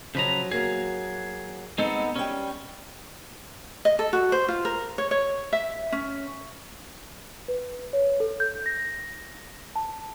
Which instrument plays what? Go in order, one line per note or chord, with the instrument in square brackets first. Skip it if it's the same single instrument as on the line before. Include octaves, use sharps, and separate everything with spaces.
[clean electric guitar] C#3 B4 A#5 [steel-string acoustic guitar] F3 F#3
[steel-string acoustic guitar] F#3 A#3 [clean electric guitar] G#4
[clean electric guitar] G#3 C4 A4 [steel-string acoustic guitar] B3 D#4
[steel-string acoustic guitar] G3 G5 [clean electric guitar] C#4
[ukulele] D#5
A4
F#4
C5
F4
A#4
C#5
C#5
E5
C#4
[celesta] B4
C#5
A4
G6
A#6
A5